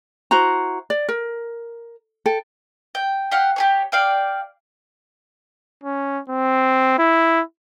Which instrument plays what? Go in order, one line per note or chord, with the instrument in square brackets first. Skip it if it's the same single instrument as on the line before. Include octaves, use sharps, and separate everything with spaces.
[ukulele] E4 F#4 C5 A#5
D5
A#4
A4 G5
[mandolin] G5
G4 F5 F#5
G4 G#4 C#5
D5 F5 G5
[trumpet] C#4
C4
E4